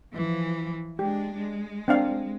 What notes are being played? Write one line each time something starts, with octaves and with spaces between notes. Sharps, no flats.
E3 F3
G#3 D4 G4
G#3
C4 D4 F5